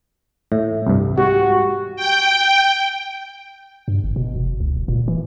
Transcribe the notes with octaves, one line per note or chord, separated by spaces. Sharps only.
A2 E5
C2 G2
G#2 F#4 G4
G5
G2
G1
B2
F1
C#2
E1
A#2
E3